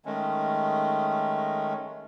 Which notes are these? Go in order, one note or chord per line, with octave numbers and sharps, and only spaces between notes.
D#3 G#3 A3 C#4